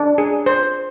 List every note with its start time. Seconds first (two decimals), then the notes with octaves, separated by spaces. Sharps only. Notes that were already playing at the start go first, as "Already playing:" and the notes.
Already playing: D4
0.18 G#4
0.46 C5